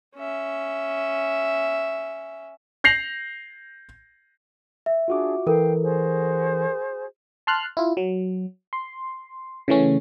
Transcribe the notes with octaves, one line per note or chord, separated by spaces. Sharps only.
C#4 E5
G6 A#6 C7 F7 F#7
E5
D4 F4 F#4 G#4 D6
E3 A4 A#4 F5 G5
F#4 G#4 C5
A5 C6 F6 F#6
E4 F4
F#3
C6
C#3 E3 A3 C#4